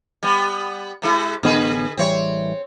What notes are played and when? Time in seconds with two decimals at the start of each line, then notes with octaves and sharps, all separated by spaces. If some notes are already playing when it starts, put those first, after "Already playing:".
0.23 G3 B3
1.02 C3 G#3 E4
1.43 A1 D3 B3 G#4 B4
1.97 A1 E3 G3 C4 C#5